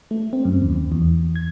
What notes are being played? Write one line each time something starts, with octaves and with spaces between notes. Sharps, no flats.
A3
C4
F#2
D#2
E2
G#6